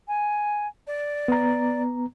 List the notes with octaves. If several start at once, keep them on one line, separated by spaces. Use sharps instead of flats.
G#5
D5
B3 A#5